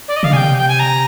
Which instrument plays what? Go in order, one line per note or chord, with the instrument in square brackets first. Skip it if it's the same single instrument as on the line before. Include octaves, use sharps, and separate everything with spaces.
[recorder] D5
D#5
[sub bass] D3 [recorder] F5
[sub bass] C3 [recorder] G#5
[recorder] G5
G5
G#5
A#5